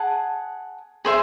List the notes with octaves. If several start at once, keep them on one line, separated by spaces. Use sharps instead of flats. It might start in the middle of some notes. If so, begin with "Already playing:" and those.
Already playing: G#4 F#5 A5
G#4 C5 E5